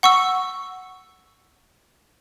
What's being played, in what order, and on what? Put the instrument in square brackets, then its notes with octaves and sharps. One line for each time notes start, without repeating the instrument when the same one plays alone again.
[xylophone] F#5 C#6 E6